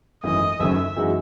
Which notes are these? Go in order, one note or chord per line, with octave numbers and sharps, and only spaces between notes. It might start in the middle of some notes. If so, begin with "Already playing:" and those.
G#1 F#2 E3 A3 D#5
F#1 F#2 D#3 A3 C#4 E5
F#2 E3 G#3 D#4 F#4